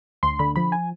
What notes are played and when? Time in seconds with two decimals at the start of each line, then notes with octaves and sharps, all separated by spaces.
0.23 D2 C6
0.39 D3 B5
0.56 F3 B5
0.72 G#5